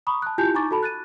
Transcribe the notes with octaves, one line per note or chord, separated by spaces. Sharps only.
A#5 B5 C#6 D#6
A5 F#6
E4 F4 G4 G#5 A5 G6
D#4 G#5 A#5 C#6 D6 A6
F#4 A4 A5 B5
F#6 A6 D#7